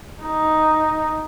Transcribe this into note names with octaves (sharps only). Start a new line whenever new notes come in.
D#4